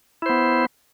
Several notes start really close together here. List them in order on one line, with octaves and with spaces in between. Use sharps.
E4 C5 B3